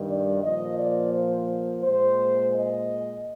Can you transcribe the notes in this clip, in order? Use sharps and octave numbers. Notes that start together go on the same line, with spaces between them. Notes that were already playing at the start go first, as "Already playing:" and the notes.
Already playing: G2 D#3 G3
D5
A#2 F3 A#3 D#5
D5
C5
A#2 G#3 C5
D#5